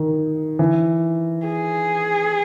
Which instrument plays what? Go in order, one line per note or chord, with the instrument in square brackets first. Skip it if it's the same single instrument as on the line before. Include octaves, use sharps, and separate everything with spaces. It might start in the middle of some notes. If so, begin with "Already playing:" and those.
Already playing: [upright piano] D#3
E3
[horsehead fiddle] G#4